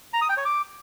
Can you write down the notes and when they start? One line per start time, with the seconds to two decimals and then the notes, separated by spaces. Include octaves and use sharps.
0.13 A#5
0.21 D#6
0.29 G5
0.37 C#5
0.45 D6